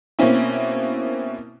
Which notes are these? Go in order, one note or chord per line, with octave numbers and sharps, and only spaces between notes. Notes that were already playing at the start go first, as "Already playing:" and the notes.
B2 A#3 C4 C#4 E4